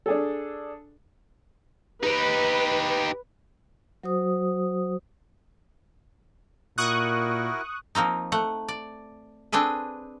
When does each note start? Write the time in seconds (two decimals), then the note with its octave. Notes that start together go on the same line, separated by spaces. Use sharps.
0.06 D4 G#4 A4
2.03 D#4 G4 B4
4.03 F#3 F#4 C5 D#6
6.78 A#2 E4 F#4 A#4 C#6 D#6 F#6
7.95 F3 A#3 C4 D#4
8.32 A3 F#5
8.68 D5
9.52 C4 D4 G#4 A4 B4